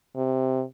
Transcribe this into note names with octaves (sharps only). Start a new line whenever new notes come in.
C3